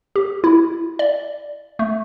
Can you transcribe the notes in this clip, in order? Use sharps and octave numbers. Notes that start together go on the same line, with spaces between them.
G4
E4
D5
A3